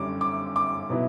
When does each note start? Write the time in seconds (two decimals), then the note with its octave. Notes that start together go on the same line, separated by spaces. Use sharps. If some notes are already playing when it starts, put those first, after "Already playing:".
Already playing: F#2 D3 G3 C#4 D6
0.21 D6
0.56 D6
0.90 B2 F#3 B3 E4